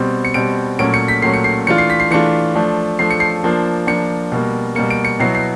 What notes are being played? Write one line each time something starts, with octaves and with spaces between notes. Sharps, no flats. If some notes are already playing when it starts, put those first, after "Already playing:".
Already playing: B2 G3 C4
C#7
B2 G3 C4 D7
A#2 F#3 A3 C#4 D7
C#7
B6
A#2 F#3 A3 C#4 C7
C#7
C7
E3 A3 D4 F4 C#7
C7
B6
C7
E3 A3 D4 F4 C#7
F3 A3 D4
F3 A3 D4 C7
C#7
C7
F3 A#3 D4
F3 A#3 D4 C#7
B2 G3 A#3
B2 G3 A#3 C#7
D7
C#7
B2 F#3 B3 E4 C7
C7